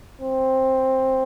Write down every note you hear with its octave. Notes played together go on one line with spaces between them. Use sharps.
C4